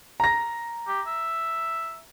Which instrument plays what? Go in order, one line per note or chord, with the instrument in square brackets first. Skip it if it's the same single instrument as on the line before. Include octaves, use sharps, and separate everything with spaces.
[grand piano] A#5 A#6
[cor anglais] G4
E5